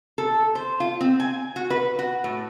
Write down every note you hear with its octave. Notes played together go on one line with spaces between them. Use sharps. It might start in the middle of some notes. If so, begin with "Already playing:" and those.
A4
C5
F4
C4
G#5
F#4
B4
F#4
A2